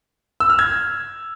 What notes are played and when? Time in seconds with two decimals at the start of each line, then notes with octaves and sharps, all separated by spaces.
0.40 E6
0.50 F6
0.59 G#6